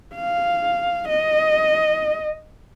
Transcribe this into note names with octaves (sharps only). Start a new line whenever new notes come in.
F5
D#5